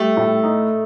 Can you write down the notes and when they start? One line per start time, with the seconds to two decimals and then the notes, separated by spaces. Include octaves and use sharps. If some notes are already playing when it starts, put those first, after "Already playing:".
Already playing: G3 A3
0.17 A2
0.43 D#4